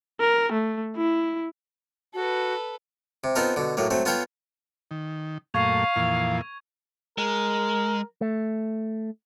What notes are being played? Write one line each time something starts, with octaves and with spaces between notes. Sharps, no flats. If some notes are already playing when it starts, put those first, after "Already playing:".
A#4
A3
E4
F#4 A4 B4
C3
B3 C4 D#4 F4 A4 A#4
B2 D3
A2 F#3 A#3
F#3 A3 C4
B3 F4 A4 C#5 F5 G5
D#3
F#2 A#2 A3 F5 C#6 G#6 F7
F2 A#2 E3
G#3 A#4
A3